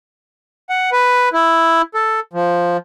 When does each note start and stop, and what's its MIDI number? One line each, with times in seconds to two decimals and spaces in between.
0.70 0.90 78
0.92 1.29 71
1.33 1.82 64
1.94 2.20 69
2.33 2.77 53